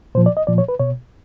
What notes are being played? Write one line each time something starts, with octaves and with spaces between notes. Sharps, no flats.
A#2 F3 C5
D5
D#5
A#2 F3 D5
C#5
B4
B2 C#5